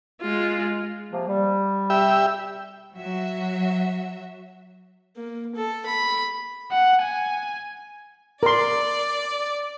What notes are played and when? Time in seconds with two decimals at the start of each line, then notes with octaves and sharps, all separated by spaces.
0.22 G#3 F4
1.12 C3 F3 A#3
1.27 G3
1.90 G4 E5
2.96 F#3 F#4 E5
5.17 A#3
5.56 A4
5.86 B5
6.72 F#5
7.02 G#5
8.43 A#4 D5 C6